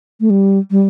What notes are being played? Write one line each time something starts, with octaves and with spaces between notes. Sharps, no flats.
A3
G3
G3